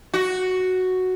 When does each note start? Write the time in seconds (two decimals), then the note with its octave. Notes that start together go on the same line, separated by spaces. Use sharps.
0.14 F#4